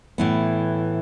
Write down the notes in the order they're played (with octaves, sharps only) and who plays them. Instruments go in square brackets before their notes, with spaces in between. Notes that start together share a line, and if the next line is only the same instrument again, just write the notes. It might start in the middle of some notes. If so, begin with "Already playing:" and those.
[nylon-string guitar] A2 E3 B3